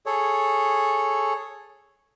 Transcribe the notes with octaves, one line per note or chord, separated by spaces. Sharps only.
G#4 A4 C#5